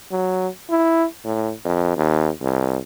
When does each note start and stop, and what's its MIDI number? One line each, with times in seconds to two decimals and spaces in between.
0.11 0.48 54
0.70 1.05 64
1.24 1.52 45
1.65 1.96 41
1.97 2.30 39
2.41 2.78 36